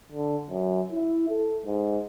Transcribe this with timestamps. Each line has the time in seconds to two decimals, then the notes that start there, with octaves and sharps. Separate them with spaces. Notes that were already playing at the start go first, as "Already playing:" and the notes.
0.12 D3
0.49 F#2
0.92 E4
1.30 A4
1.66 G#2